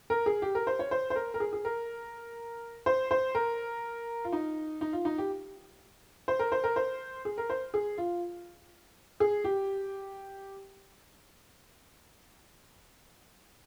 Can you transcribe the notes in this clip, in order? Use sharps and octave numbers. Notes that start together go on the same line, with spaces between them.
A#4
G#4
G4
A#4
C5
C#5
C5
C5
A#4
A#4
G#4
G#4
A#4
C5
C5
A#4
F4
D#4
D#4
F4
D#4
G4
C5
A#4
C5
A#4
C5
G#4
A#4
C5
G#4
F4
G#4
G4